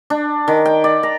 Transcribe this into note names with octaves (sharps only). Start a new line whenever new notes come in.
D4
D#3
G5
D5
A#5